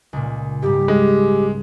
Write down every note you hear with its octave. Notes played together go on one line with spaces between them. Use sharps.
C#2 A#2
G#2 G3 G4
G#3